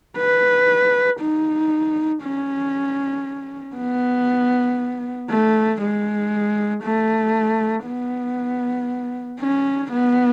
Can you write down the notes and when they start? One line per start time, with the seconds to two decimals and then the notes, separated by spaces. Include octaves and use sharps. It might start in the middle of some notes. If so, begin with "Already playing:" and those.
0.17 B4
1.19 D#4
2.23 C#4
3.76 B3
5.29 A3
5.81 G#3
6.83 A3
7.86 B3
9.40 C#4
9.92 B3